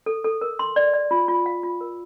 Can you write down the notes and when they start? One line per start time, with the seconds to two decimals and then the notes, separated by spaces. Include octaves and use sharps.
0.06 A4
0.24 A4
0.41 A#4
0.59 C6
0.76 D5
0.93 D5
1.11 F4
1.28 F4
1.46 F5
1.63 F4
1.81 A#4